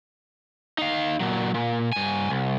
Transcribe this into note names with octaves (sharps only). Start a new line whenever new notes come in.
D#4 F5
A#2 F#3
A#2
G2 G#5
C2